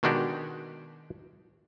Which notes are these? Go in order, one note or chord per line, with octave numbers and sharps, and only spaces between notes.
B2 D#3 G#3 D4 F#4 G4